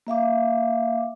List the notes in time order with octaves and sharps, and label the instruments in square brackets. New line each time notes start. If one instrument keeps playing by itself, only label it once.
[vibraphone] A#3 E5 F5 D6